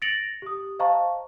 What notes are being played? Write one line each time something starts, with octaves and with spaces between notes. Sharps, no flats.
A6 A#6 C#7 D7 F7 F#7
G4 D#6
C5 D#5 F5 A5 A#5 C#6